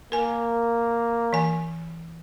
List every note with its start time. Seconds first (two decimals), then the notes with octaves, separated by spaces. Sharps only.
0.12 A#3 A#4 G#5
1.33 E3 G#5